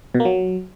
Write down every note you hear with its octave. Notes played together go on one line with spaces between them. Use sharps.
B2
A#3
F#3